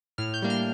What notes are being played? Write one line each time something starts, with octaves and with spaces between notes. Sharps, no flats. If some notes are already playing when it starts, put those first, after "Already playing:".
A2 F6
G6
G3 A#3 D4
F6